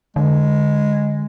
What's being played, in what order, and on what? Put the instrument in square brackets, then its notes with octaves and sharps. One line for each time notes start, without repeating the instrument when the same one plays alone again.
[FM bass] D3 [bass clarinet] G#3